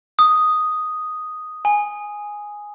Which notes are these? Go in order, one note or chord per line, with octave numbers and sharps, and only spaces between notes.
D#6
G#5